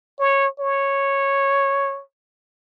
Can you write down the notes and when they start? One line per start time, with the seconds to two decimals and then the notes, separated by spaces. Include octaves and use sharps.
0.19 C#5
0.60 C#5